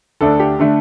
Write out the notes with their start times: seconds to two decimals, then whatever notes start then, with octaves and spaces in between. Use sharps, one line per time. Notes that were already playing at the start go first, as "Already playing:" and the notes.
0.21 D2 D3 A3 D4 A4
0.40 G4
0.59 D3 A3 D4 A4